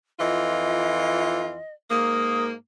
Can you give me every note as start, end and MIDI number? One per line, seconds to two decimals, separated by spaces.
0.19 1.57 41
0.19 1.57 52
0.19 1.57 65
0.19 1.73 75
1.90 2.52 44
1.90 2.52 58
1.90 2.45 87